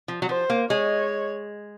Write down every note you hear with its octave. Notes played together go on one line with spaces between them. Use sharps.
F3
F#3
F3 C5
A#3
G#3 C#5